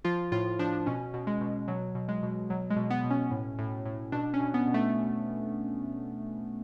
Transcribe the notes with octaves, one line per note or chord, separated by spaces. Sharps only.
F3 F4
A2 F4
F3 D4
B2 C#4
B2
G#3
B2
B2 F#3
B2
G#3
B2
B2 F#3
G#3
B2
B3
B2
C#4
A2
A2
A2
B2 D4
C#4
B2
B3
B2
A3